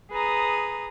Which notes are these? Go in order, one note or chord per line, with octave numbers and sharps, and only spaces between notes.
G#4 B4 A#5 D#6